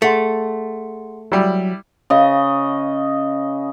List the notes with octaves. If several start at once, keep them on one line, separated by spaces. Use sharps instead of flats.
A3 G#4 F#5 C6
F#3 G3 E4
C#3 D#5